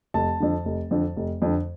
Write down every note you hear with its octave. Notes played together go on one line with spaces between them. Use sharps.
F1 A5
F2 D3
F1
F2 D3
F1
F2 D3